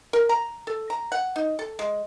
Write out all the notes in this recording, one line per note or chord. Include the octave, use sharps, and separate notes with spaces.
A#4
A#5
A4
A#5
F#5
D#4
A4
G#3